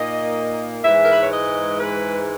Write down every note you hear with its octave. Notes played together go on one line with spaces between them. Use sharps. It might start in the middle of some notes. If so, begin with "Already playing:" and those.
Already playing: A#2 A#3 D#4 D#5
G#2 E3 G#3 E5
A#4
B4
C#5
D#5
B4